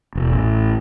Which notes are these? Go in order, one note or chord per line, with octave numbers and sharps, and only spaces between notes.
E1
A1